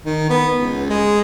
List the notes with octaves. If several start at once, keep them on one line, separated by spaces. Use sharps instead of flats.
D#3
B3
C#2
G#3